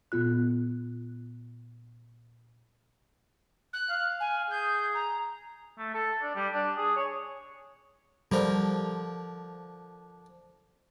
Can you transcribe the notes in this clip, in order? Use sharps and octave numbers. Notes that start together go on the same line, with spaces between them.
A#2 B3 F4 F#6
F#6
F5
G#5
G#4 G6
A#5
A3
A4
D4
G3
D4
G#4
C#5
D3 F3 G3 A#4